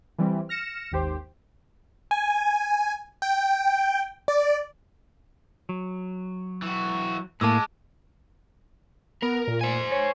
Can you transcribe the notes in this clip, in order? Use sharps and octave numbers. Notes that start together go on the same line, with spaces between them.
E3 G3 C4
F6 A#6 C#7 E7
G#1 D#2 G4 C5
G#5
G5
D5
F#3
E3 F#4
A2 G#3 A#3 A5 D6 E6
B3 A#4
A#2
C5 G#5
C#5